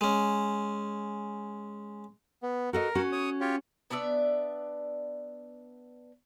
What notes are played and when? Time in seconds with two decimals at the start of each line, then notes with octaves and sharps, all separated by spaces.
0.01 G#3 C#4
2.43 B3
2.73 F#4 A4 A#4 D#5
2.95 C#4 F#4
3.12 C#5 D#6
3.41 F4 G4 C#5
3.90 B3 D4 D5 E5